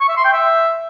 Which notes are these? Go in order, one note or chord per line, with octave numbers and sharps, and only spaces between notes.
C#6
E5
C6
G5
E5